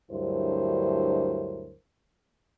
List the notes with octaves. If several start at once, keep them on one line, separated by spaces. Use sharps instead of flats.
D2 G2 F#3 E4 A#4 C5